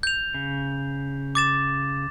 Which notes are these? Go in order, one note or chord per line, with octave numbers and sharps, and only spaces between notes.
G6 F7
C#3
D6 A6 E7